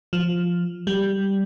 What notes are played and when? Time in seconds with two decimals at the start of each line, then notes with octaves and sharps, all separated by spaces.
0.13 F3
0.87 G3